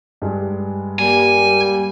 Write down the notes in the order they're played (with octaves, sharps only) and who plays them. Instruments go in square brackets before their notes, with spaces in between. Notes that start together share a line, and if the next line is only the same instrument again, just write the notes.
[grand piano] G2 G#3
[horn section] G3 A#3 [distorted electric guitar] G#5